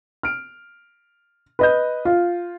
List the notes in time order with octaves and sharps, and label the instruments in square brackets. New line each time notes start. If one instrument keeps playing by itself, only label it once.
[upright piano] F6 D7
B4 D#5 G6
F4